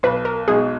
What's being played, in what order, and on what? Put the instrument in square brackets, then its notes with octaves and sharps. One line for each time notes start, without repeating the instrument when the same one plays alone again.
[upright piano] B1 [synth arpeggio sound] B4
[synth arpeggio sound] A#4
[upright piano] B2 G#3 D#4 F#4 [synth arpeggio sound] G#4